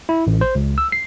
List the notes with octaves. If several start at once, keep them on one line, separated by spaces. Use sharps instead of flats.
E4
A1
C5
C#2
E6
C7